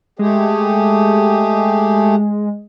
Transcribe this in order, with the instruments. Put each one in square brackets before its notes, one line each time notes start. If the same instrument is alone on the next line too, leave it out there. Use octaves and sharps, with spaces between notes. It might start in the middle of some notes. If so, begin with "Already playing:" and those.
[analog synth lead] G#3 [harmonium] A3 G4 G#4